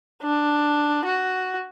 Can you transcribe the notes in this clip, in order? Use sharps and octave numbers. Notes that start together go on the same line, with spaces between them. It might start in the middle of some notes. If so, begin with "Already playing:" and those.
D4
F#4